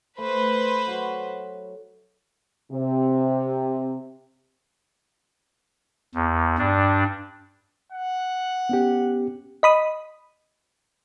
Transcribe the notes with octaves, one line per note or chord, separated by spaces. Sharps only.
A3 B4 C5
F#3 F#4
C3
E2
G2 D4
F#5
B3 C#4 G4
D#5 B5 D#6